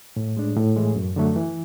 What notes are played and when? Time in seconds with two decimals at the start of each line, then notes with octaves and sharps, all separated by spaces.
0.16 A2
0.37 G#3 D4
0.56 A2
0.76 E3 G#3
0.96 F#2
1.16 D3 F#3 A3
1.36 E3